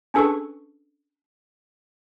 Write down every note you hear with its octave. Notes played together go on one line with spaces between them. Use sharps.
C#4 D4 G#4 A4 B4 C#6